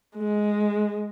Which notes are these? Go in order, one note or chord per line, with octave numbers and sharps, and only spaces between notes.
G#3